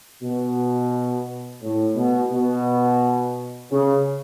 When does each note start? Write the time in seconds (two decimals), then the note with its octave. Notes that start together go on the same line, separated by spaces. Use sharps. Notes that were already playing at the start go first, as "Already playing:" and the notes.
0.23 B2
1.62 A2
1.97 B2
2.31 B2
3.71 C#3